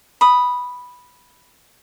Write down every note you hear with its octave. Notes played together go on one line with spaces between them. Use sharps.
B5 D#6